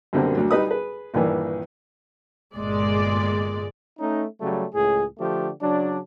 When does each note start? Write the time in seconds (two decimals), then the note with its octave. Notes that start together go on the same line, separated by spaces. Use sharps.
0.13 F#2 B2 D3 G3 A#3 C4
0.36 D2 F#3 D4
0.51 G3 D#4 B4 D#6
0.67 G#4 B4
1.14 A#1 G2 D#3 E3
2.55 G1 A#2 G#3 D5
3.99 A3 C#4 D#4
4.41 C#3 F#3 G3 A3
4.74 C#2 A2 G#4
5.19 D3 F3 A3 G4
5.61 C#3 F#3 D4